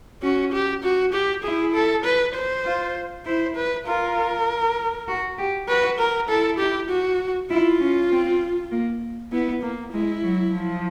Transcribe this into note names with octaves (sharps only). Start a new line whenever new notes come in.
C#4 F#4
G4
F#4
G4
E4 G#4
A4
B4
C5
F4
E4 C5
B4
F4 A#4
F#4
G4
F#4 B4
A#4
E4 A4
G4
F#4
E4 F4
C#4
C4
A#3
B3 E4
A#3
G#3 E4
F#3
F3